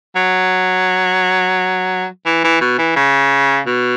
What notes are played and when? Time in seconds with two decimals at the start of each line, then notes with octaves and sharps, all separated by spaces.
0.16 F#3
2.26 E3
2.44 E3
2.61 B2
2.79 E3
2.96 C#3
3.67 B2